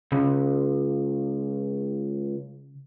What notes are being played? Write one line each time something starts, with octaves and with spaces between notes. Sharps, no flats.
C#2 C#3